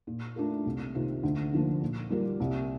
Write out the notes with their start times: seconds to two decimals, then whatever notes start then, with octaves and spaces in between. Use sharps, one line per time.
0.07 A#2
0.36 A3 D4 F4 A#4
0.65 C2
0.95 C3 D#3 A#3 F4
1.23 D2
1.53 D3 F3 A#3
1.81 A#2
2.10 G3 A#3 F4 A#4
2.40 C2